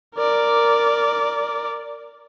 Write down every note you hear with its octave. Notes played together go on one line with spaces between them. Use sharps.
A#4 D5